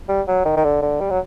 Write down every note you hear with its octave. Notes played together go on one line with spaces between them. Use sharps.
G3
F#3
D#3
D#3
D3
D3
G3
F#3